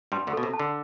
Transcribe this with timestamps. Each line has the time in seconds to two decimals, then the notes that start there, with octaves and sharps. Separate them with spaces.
0.12 G2 G3 C6
0.27 D2 D3
0.33 B2 A4
0.43 C3
0.53 A5
0.60 D3